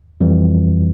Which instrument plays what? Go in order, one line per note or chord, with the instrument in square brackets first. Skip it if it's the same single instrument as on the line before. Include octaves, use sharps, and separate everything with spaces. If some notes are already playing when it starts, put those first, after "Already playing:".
[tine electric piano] F2 E3 G3